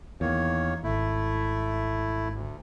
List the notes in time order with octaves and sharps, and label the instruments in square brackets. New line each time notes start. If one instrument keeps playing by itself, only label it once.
[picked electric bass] E2 [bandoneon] D#3 A#3 C#5
[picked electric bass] G#1 [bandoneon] A3 E4
[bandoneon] D2